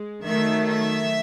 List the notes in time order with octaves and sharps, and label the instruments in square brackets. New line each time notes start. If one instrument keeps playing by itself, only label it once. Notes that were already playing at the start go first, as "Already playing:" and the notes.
Already playing: [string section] G#3
D#3 F#3 A3 E5
E5